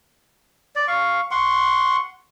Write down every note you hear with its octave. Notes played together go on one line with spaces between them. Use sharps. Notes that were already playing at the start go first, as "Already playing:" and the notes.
D5
F5 C#6
F#5 C6 C#6